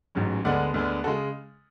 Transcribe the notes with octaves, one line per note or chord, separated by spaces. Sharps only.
A1 G#2 F#3 C#4
D2 D3 G#3 B3 D4 D5 F#5
D2 D3 G#3 B3 D4
C#3 G#3 F#4 A4